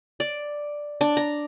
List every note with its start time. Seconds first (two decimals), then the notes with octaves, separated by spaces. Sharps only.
0.20 D5
1.01 D4
1.17 A#5